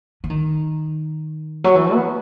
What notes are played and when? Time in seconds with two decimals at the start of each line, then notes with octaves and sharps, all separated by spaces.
0.24 E3
0.30 D#3
1.64 F#3
1.75 E3
1.93 B3